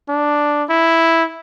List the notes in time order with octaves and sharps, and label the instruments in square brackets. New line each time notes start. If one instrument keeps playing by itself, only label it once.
[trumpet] D4
E4